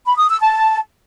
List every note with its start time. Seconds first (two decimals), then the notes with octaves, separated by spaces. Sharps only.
0.06 B5
0.18 D#6
0.29 E6
0.40 A5